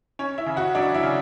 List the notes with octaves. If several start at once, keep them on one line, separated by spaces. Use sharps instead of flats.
C#4 C#5
E4 E5
C#3
F#4 F#5
F#3 D4 D5
E4 E5
C#3